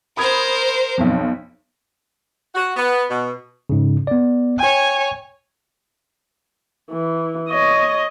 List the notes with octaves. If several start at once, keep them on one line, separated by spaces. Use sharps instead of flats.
A#4 C5 B5 D#6 G#6
B1 F2
F#4
B3
B2
G#2 C#3
B3 D5
C#5 G5 G#5
E3
C#5 D#5